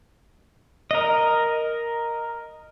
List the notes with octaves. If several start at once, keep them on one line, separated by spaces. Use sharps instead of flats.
A#4 D#5